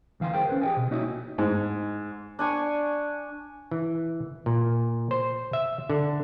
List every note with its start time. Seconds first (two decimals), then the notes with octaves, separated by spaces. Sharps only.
0.20 D2 E3 F5 G#5 C6
0.34 G#4 A#4 C5 G5
0.48 C#4 B4 C5
0.62 G4 G#4 C#5 D#5 G5 G#5
0.77 B2
0.91 A#3 D#4 E4 F#4 C#5 D#5
1.38 G#2
2.39 D4 G#5 C#6
3.71 E3
4.46 A#2
5.11 C5
5.53 E5
5.90 D3